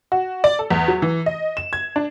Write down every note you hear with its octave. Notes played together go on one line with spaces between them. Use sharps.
F#4
D5
A4
E2
F#3
E3
D#5
E7
G#6
D4